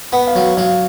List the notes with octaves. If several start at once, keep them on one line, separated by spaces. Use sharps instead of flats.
B3 F#5
F5
F#3
F#3 F5